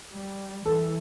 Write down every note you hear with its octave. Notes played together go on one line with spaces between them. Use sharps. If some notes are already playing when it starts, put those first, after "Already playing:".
G3
E3 A4